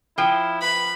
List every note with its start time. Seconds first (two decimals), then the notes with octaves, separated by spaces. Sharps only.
0.18 F3 E4 G5
0.62 B4 B5